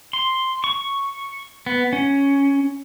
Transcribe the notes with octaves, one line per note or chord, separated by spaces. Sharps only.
C6
C#6
B3
C#4